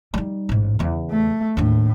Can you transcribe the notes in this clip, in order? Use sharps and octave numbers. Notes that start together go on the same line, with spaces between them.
G3 D#4
A1 G#2
E2 C#3
A3
D#2 A2 D4